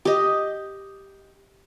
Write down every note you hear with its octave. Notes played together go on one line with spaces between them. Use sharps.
G4 D#5